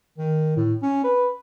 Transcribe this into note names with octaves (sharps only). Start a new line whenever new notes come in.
D#3
A2
C#4
B4